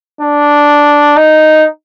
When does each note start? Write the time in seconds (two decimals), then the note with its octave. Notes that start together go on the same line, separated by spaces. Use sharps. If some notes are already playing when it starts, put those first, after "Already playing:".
0.21 D4
1.16 D#4